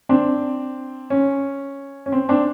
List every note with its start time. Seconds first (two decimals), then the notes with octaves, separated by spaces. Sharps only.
0.09 C4 D4
1.10 C#4
2.06 C#4
2.12 C4
2.29 C4 D4